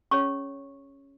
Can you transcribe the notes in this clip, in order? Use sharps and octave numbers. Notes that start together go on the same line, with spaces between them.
C#4 G#4 C#5 C#6